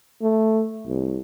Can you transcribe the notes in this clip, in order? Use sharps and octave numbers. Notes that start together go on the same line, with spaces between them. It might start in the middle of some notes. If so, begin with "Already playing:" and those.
A3
C2